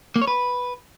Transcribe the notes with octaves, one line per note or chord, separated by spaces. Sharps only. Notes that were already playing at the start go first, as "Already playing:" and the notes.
A#3
C#5
B4